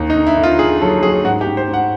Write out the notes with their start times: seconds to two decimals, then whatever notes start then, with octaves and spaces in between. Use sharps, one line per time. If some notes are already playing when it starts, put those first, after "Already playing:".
Already playing: D#2
0.10 D#4
0.16 D3
0.27 E4
0.37 D3
0.43 F4
0.59 D3 G#4
0.81 F#3 A4
1.03 F#3 G#4
1.24 G#2 F#4
1.41 G4
1.47 G#2
1.57 C5
1.68 G#2
1.73 F#5